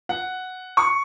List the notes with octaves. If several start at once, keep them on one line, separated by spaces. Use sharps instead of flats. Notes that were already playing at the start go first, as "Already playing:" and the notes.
F#5
C#6